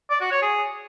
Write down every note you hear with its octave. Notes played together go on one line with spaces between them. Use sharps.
D5
F#4
C#5
G#4